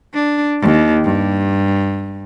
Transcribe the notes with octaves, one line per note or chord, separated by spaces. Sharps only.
D4
D#2
G2